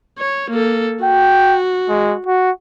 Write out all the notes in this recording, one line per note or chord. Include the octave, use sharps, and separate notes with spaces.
C#5
A#3 A4
F#4 G5
G#3
F#4